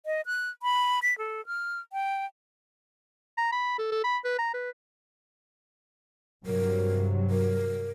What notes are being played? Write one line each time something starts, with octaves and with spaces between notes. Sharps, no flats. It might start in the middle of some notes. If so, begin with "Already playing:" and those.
D#5
F#6
B5
B6
A4
F6
G5
A#5
B5
A4
A4
B5
B4
A#5
B4
G2 C3 F#3 A#4
A#4